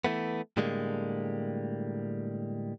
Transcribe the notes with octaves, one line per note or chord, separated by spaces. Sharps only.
E3 A3 B3
A2 D3 G3 G#3 A#3